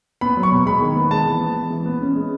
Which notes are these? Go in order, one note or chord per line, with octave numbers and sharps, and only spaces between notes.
B3 B5
F#3
C#6
B2
G#3 B5
D#3
B3
G#3 A5
E3
B3
G#3
E3
B3
C#4
G#3